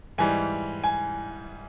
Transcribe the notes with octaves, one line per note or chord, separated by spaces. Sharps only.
G#2 E3 G3 G#5
G#5